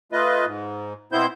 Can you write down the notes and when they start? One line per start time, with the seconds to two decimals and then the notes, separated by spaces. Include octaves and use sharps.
0.12 A3 F4 B4 D#5
0.45 G#2
1.12 B2 B3 C4 E4 C5 G6